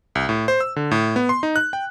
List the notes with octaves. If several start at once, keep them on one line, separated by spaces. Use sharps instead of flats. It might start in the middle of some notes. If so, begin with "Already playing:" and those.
C2
A2
C5
E6
D3
A2
B3
C6
D#4
F#6
G5